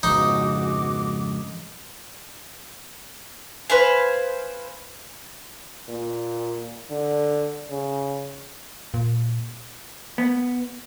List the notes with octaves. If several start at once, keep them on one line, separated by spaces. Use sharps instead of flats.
F2 G#2 C#3 D#4 F#4 D6
B4 C5 F5 G#5
A#2
D3
C#3
A#2
B3